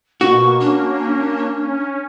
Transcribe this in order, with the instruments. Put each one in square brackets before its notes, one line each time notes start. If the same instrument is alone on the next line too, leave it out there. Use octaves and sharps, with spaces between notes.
[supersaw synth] B2 A#3 [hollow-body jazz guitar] F#4 [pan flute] C#6
[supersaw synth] A#3 C#4 [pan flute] D4
[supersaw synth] C#4